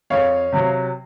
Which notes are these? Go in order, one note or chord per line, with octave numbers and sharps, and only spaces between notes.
F2 C#5 F5
C3 F#3